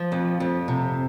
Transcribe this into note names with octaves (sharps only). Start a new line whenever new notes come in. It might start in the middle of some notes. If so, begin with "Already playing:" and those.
Already playing: F3
F2
F2
C3